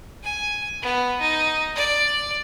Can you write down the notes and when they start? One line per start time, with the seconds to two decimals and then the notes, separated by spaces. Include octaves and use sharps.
0.23 G#5
0.82 B3
1.21 D#4
1.75 D5